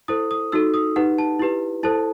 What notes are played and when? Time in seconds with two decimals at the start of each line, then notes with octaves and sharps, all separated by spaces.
0.08 E4 A4 C5 D#6
0.31 D#6
0.52 D#4 F#4 A4 E6
0.74 D#6
0.96 D#4 G4 B4 F#5
1.18 A5
1.39 E4 G4 B4
1.83 E4 A4 C5 A5